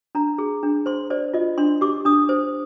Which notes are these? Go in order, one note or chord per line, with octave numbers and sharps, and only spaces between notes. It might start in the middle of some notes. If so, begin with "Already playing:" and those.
D4 A#5
G#4
D4
C5 C6
C5 D5
F4 D#5
D4 C6
G4 D6
D4 D#6
C5